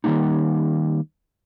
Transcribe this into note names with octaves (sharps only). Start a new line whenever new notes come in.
D#3 F#3 G3 A#3 D#4